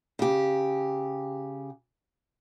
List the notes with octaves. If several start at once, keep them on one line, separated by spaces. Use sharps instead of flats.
C#3 G4